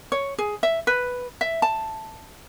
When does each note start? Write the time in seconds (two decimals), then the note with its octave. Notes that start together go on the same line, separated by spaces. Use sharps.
0.12 C#5
0.38 G#4
0.63 E5
0.87 B4
1.41 E5
1.62 A5